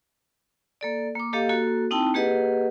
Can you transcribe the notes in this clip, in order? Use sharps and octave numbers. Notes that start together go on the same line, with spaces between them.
A#3 A4 D5
A#3 D6
A#3 G4 A4 D#5 F5
A#3 F#4 A4
C4 D#4 E4 G5 A5
A#3 G4 G#4 B4 D#5 F#5